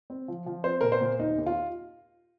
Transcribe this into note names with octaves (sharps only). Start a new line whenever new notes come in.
C4
F3
F3
C4 C5
A#2 A#4
C5
A#2
D#2 D#4
D#2
F4